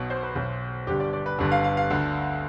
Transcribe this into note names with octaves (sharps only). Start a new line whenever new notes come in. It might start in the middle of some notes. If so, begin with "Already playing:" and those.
Already playing: B1 B2
C5
B4
B1 B2
G1 G2 D3 G4
D5
D5
B4
G1 G2 D3
F5
F5
F5
D2 D3